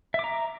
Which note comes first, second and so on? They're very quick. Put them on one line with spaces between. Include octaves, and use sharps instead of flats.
E5 D6 A#5